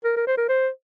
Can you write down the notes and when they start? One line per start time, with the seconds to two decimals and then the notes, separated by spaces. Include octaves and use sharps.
0.04 A#4
0.17 A#4
0.27 C5
0.37 A#4
0.49 C5